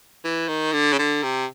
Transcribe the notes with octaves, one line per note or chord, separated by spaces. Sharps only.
E3
D#3
D3
C#3
D3
C3